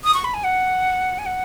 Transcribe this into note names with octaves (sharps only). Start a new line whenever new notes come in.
D#6
C#6
B5
G#5
F#5
G#5
F#5